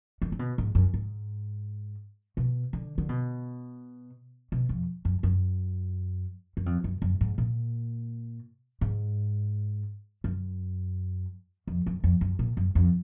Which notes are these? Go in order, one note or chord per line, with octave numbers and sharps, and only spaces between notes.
D3
D3
B2
G#2
F#2
G#2
B2
D3
D3
B2
B2
F2
F#2
F#2
F#2
F2
F#2
F#2
G#2
A#2
G#2
F#2
F2
F#2
F2
F#2
A#2
F#2
F2